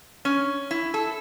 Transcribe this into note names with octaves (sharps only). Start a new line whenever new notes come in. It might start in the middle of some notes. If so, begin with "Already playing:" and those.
C#4
E4
A4